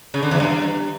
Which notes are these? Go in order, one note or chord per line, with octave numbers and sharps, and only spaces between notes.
C#3
D3
E2
G2